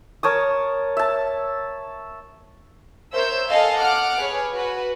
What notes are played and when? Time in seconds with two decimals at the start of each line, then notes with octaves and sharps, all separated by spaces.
0.23 A#4 C#5 A5 D#6
0.97 E5 A5
3.14 A#4 C5 C#5 E5 E6 G6
3.48 A4 D#5 F5 G#5
3.78 F#5 D6 F6 F#6
4.18 G#4 B4 C#5
4.54 F#4 B4